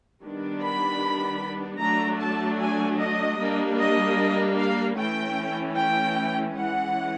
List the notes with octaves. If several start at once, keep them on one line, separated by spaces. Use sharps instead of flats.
D#3 G3 B3 D4
B5
F#3 A3 D4 A#5
A5
G#5
D#5
G3 A#3 D4
D#5
F5
E3 A3 C#4 G5
G5
E3 G#3 C#4 F#5